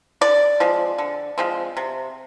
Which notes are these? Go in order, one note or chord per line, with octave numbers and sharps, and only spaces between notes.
D3 D5
F3 G#3 C4
D3
F3 G#3 C4
C3